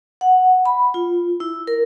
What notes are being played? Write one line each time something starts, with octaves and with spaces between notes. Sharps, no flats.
F#5
B5
F4
E4
A#4